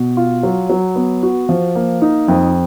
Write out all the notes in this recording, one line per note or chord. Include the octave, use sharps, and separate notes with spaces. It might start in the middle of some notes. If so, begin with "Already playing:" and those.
Already playing: B2
F4
F#3
F#3
B3
F#4
F3
A#3
D#4
F2